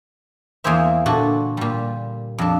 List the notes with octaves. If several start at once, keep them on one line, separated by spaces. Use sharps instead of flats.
E2 A#3 G#4 C5 E5
A#2 D3 F#4 A4
A#2 G3
F2 D4